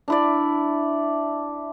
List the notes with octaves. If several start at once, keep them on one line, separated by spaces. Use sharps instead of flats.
D4 E4 D5